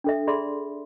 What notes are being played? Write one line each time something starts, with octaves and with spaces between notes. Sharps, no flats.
D4 A4 E5
G#4 D5 E5 B5 C6